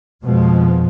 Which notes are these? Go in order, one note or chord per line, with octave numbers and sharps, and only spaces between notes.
F2 B2 F3 G#3